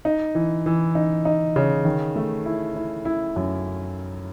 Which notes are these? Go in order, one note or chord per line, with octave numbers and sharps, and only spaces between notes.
D#4
E3
E3
D#4
D#4
C#3
D#3
A3
E4
E4
E4
F#2